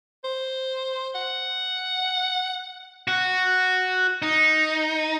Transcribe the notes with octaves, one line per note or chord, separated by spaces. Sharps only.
C5
F#5
F#4
D#4